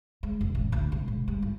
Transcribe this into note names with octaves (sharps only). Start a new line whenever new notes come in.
G#3
F1
A1
D2
C2
G#2
G3
F4